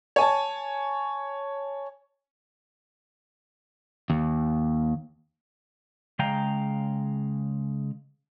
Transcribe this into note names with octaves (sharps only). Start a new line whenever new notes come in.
C#5 G#5 A5
D#2
C#3 G#3 F5 G5 A#5